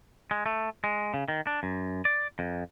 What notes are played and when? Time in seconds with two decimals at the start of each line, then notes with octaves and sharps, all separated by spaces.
0.31 G#3
0.46 A3
0.84 G#3
1.14 C#3
1.28 D#3
1.47 D4
1.63 F#2
2.05 D5
2.39 F2